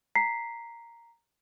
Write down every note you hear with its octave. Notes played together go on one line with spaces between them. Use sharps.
A#5 B6 C7